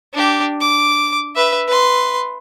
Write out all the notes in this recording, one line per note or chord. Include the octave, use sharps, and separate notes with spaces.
D4 G4
D6
B4 E5
B4 C6